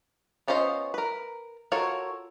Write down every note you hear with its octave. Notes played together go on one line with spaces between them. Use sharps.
B3 C#4 F4 C5 D#5
A#4 B4
F4 F#4 A4 A#4 C#5